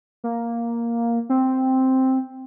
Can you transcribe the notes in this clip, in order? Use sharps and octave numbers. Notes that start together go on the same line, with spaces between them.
A#3
C4